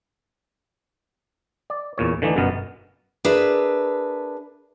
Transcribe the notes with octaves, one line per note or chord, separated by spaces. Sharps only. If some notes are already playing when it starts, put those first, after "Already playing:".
D5
E2 A#2 C#5
D3 E3 A3 D4 D#4
G1 F#2 B2 B3 A#4
D4 G#4 A#4 B4 E5